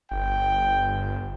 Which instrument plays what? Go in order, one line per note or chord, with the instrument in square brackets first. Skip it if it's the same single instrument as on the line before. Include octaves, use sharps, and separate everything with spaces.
[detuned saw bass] G1 [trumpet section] G5